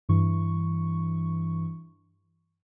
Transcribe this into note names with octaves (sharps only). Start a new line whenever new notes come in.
G2 E3 C#6